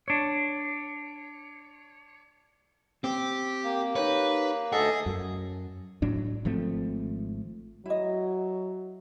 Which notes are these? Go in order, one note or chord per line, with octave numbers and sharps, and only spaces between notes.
D4 C#5
C4 G4
A#3
D#4 G4 B4 C#5
D2 G#4 A4 D#5 F#5
F#2
A2 F#3 D4
G#1 F3 A3 C4
F#3 E4 D#5